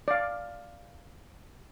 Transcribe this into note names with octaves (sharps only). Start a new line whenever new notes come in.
D5 F5